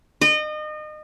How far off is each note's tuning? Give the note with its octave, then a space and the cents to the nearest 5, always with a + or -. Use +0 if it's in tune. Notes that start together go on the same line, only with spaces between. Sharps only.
D#5 -30